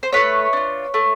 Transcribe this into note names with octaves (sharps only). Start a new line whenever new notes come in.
C5
A3 B4 C#5
D4 F4
A3